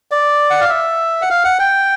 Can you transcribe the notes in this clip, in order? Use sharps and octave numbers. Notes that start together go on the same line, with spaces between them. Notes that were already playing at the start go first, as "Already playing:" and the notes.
D5
F#5
F5
E5
F#5
F5
F#5
G5